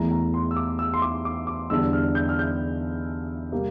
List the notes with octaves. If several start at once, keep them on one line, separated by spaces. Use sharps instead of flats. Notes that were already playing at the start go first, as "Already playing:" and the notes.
Already playing: E2 E3 A3 A#5
A#5
C6
E6
D6
E6
C6
D6
D6
D6
E2 D3 G3 D4 E6
F6
G6
F6
G6
C3 G3 A#3